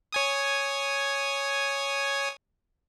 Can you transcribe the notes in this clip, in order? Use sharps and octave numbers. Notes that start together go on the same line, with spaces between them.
C#5 G#5 D#6